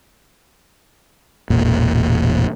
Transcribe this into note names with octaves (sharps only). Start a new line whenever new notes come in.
E1 A1 A#2